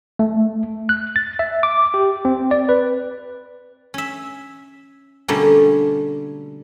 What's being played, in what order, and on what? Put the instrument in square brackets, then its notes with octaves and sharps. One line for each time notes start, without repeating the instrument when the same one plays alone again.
[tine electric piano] A3
F#6
A6
E5
D6
G4
C4
D5
B4
[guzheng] C#4 E5
B2 D3 G3 A3 A#3 C#4